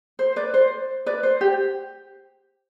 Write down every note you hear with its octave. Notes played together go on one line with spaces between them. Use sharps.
C5
B4 D5
C5
B4 D5
C5
G4